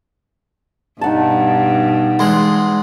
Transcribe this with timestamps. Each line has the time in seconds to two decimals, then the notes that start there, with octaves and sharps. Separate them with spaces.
1.01 G2 B2 D#4 F#5 A5
2.19 E2 G#3 C6